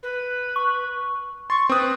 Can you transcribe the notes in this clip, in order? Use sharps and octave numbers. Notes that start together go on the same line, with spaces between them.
B4
C#6
C6 C#6 A6
C4 B4 D#6